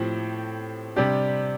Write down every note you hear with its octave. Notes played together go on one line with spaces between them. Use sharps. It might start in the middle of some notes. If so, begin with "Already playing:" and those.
Already playing: A2 F3 C4 G4
C3 G3 D4 G4